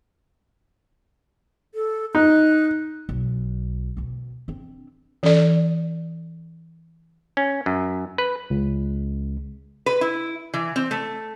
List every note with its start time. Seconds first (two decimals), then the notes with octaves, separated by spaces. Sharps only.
1.75 A4
2.15 D#4 F#6
3.09 B1
3.97 D2 B2
4.48 C4 D4
5.23 E3 C#4 A4 D5
7.37 C#4
7.66 F#2
8.18 B4
8.50 C#2
9.86 B4
10.01 E4
10.54 E3
10.76 C4
10.91 A3